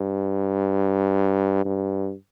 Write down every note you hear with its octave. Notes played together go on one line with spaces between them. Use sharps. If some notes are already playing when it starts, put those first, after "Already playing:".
Already playing: G2
G2